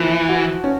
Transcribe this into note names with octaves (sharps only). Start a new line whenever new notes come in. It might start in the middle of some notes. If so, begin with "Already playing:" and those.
Already playing: E3 F3 A#3
F#4
C#4